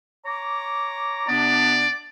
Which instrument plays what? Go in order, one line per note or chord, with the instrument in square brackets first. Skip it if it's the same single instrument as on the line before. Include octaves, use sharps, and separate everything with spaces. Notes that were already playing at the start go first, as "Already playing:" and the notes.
[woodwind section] C#5 A#5 D6
[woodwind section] C3 B3 D4 [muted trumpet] D5